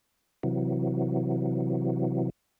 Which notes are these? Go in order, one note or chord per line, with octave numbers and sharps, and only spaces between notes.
C3 E3 F#3